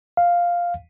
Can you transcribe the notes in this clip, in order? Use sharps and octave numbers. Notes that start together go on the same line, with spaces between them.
F5